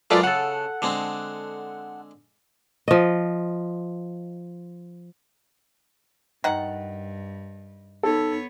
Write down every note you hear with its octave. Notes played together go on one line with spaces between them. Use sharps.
F#2 G#3 F4 A4 B4 D5
C#3 A4 F#5
D3 G#3 C4
F3 D#5
G2 D#3 F#5
B3 D#4 A4 C#5